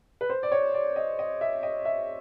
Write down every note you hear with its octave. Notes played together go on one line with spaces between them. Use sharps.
B4
C5
D5
C#5
D5
D#5
D#5
E5
D#5
E5